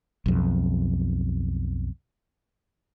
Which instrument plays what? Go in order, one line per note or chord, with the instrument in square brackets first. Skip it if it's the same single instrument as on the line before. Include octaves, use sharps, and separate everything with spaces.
[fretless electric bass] B1 F2